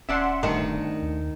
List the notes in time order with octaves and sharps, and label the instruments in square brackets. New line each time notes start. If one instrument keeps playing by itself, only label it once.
[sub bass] D#1 [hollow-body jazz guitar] C#4 D5 A5 [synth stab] E5 F#5 C6
[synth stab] G1 C2 C#7 [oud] D#3 [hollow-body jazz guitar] A3 D4
[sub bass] D#2